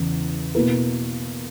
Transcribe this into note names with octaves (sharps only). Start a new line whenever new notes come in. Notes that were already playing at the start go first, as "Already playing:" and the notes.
Already playing: E2 C#3 E3
B2 A#3 E4 B4